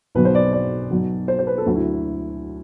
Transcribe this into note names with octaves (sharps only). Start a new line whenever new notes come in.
B1 B2 F#3 B4
C5
D5
D5
B1 B2 F#3
C5
C5
B4
A4
D2 D3 F#3 F#4
E4